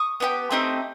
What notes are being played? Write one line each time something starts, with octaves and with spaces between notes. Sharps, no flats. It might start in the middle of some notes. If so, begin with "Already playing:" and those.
Already playing: C#6 D#6
B3 E4 G4
A3 C4 D#4 G4